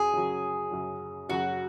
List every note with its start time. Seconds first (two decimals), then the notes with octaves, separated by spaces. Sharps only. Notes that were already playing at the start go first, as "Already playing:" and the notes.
Already playing: F#2 F#3 G#4
0.13 F#2 C#3 F#3
0.71 F#2 C#3 F#3
1.29 F#2 C#3 F#3 F#4